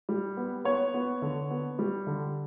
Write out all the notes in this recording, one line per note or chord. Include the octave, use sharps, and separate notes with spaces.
G3
B3
B3 C#5
B3
D3
B3
G3
D3